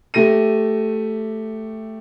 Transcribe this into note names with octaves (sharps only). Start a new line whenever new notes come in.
A3 G4 A#6 D#7